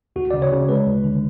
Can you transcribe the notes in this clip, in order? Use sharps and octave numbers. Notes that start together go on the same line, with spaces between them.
D2 F#4
C#3 D5
C#5
C#3
G#3 B4
D2
D3